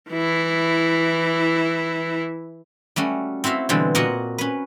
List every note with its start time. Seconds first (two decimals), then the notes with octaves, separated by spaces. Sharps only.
0.11 E3 E4
2.96 G3 A3 C#4 F#4
3.44 C4 E4 F#4 E5 F5
3.69 B2 D3 E3 G3 G#3 C4
3.95 A#2 F#4 A#4 D#5 F#5 G#5
4.38 C#4 B4